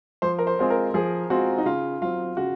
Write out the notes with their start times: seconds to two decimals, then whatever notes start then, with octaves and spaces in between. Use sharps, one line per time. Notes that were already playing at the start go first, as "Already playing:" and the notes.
0.22 F3 C5
0.39 A#4
0.47 C5
0.59 G#3 C4 F4 G#4
0.70 A#4
0.94 F3 G#4
1.30 G#3 C4 F4 F#4 G#4
1.58 D#4
1.65 C#3 F4
2.02 F#3 C4 F4
2.37 C#3 F#4